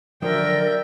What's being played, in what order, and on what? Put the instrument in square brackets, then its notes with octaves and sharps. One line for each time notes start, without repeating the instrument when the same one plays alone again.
[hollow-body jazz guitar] D3 F3 F#3 [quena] A#4 [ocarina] D5 [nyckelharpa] E5 G5